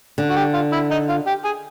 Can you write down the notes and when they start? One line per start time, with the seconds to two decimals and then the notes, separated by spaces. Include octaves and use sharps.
0.18 D3
0.30 F#4
0.36 G4
0.54 F4
0.72 E4
0.91 D#4
1.09 F4
1.27 G4
1.44 G#4